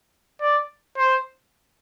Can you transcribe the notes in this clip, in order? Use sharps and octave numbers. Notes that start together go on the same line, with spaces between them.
D5
C5